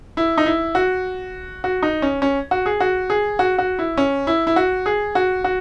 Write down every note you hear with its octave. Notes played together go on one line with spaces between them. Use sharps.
E4
D#4
E4
F#4
F#4
D#4
C#4
C#4
F#4
G#4
F#4
G#4
F#4
F#4
E4
C#4
E4
E4
F#4
G#4
F#4
F#4